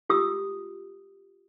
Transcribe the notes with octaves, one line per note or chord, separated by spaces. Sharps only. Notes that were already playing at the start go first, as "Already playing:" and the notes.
F4 G4 D#6 E6